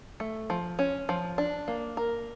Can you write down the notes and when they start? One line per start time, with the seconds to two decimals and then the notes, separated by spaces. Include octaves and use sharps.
0.20 A3
0.50 F3
0.79 C#4
1.09 F3
1.38 D4
1.68 A#3
1.97 A#4